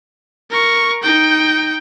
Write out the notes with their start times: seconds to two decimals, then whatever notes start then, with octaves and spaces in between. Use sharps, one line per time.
0.50 A#4 C#6
1.03 D#4 G5